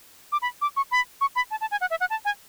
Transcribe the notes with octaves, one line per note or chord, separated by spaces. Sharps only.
D6
B5
D6
C#6
B5
C#6
B5
A5
A5
G#5
F#5
E5
F#5
A5
G#5